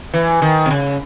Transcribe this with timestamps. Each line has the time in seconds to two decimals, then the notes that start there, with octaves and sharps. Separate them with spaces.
0.14 E3
0.42 D#3
0.66 C3
0.71 C#3